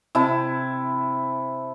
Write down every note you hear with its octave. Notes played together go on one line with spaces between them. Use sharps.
C3 E4 A5